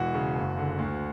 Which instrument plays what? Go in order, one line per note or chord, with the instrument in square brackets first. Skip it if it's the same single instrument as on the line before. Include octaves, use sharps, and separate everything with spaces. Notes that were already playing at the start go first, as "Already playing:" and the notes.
Already playing: [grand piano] E1 E3 F#4
C#3
F#1
D3
D2